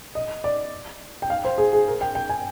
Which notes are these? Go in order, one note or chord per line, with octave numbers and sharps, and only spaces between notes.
D#5
D5
G5
F5
C5
G#4
G#4
A#4
G5
G5
G#5